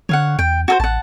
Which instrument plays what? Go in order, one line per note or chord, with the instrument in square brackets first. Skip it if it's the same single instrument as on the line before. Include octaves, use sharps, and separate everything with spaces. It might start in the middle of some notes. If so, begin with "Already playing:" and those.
[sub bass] D3 [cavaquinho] C#5 F5 F#5
[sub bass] E2 [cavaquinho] G5
[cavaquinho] F#4 A4 C5
[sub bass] A1 [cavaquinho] F#5 A5